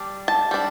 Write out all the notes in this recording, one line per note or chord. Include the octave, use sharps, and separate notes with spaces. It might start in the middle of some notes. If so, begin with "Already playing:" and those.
Already playing: G3 D4
A5
G3 D4